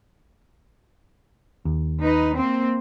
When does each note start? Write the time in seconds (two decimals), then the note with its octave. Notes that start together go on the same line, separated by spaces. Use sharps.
1.65 D#2
2.03 D#4 B4
2.37 A#3 C4